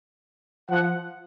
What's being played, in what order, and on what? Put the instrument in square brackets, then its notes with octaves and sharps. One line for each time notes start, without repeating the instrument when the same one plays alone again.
[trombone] F3 [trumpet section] F#5